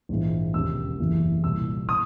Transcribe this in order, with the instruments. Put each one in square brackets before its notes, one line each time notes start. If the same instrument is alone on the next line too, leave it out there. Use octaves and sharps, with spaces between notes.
[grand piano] A#1 G#2 E3
E1 D#2 C#3 E6
F#1 E2 C#3 E3
C2 A#2 E6
D#6